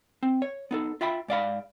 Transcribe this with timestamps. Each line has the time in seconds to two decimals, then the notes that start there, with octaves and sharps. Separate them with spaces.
0.23 C4
0.42 C#5
0.71 B3 D#4 A4
1.01 F4 E5 G5 B5
1.28 G#2 D5 F5 B5